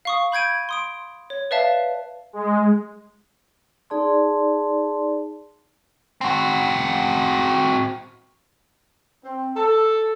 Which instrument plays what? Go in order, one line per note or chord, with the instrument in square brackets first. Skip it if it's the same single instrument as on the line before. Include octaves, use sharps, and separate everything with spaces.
[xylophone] F5 C#6 D#6
B5 G6 G#6 D7 D#7
C6 D#6 D7
C#5
B4 D5 E5 F5 A5
[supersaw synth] G#3
[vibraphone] D#4 G#4 D5 A5 C6
[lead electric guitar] C4 F#4
[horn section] C4
A4